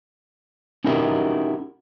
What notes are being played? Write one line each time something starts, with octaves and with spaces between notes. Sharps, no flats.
C#4 D#4 E4 F#4 G4 A#4